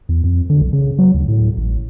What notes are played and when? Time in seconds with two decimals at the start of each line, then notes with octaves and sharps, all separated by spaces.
0.09 E2
0.24 F2
0.50 D3
0.62 B1
0.73 C#3
0.99 F#3
1.14 D2
1.28 A2
1.57 A1